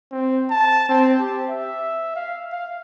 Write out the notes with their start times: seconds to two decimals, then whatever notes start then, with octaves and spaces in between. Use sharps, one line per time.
0.11 C4
0.50 A5
0.89 C4
1.20 G4
1.50 E5
2.16 F5
2.52 F5